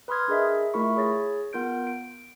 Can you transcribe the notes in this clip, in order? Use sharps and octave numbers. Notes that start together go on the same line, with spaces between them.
B4 B5 C6 D#6 F6 G#6
D4 G#4 A#4 D#5 E5
A3 E4 F4 A#4 B5 C#6
G#4 C#5 A6 A#6
B3 F4 A#4 G6 D7
D7